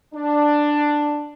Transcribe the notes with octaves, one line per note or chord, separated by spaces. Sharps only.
D4